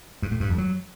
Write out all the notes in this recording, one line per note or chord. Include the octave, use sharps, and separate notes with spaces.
G2
A2
G2
F2
F#3